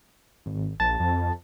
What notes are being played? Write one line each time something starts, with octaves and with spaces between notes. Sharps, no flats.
G#1
A#1 A5
F2